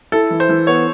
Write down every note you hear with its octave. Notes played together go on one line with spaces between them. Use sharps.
E4 A4
E3
C5
E3
B3 C#5